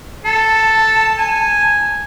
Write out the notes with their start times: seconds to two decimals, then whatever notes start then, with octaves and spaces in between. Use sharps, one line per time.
0.25 A4 A5
1.18 G#5